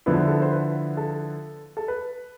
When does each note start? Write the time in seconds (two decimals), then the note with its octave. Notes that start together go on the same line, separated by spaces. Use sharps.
0.06 D3 F3 B3 E4 B4
0.13 A4
0.27 A4
0.42 C5
0.52 B4
0.97 A4
1.77 A4
1.88 B4